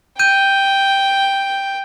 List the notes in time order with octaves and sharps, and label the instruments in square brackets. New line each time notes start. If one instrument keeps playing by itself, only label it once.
[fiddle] G5 [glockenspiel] G6 D#7